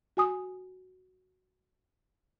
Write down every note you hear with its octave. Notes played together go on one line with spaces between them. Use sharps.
F#4 G#5 D#6